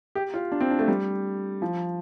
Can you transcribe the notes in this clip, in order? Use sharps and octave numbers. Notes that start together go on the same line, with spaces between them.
G4
F4
D4
C4
D4
A3
G3
F3